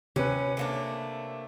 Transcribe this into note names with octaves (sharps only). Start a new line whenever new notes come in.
C3 C#4 B4
A3 A#3 D4